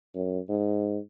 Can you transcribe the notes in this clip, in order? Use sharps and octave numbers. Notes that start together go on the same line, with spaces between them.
F#2
G#2